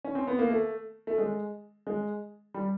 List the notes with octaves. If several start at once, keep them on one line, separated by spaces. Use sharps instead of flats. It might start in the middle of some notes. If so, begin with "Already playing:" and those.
C#4
C4
B3
A#3
A3
A3
G#3
G#3
G3